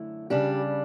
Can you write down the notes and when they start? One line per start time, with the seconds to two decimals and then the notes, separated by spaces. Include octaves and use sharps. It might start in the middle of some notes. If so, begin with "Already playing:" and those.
Already playing: F#2 D3 A3 E4
0.30 C#3 G3 D4 G4